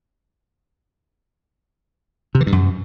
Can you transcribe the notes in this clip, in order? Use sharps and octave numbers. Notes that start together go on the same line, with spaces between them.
C3
E3
G2
F#2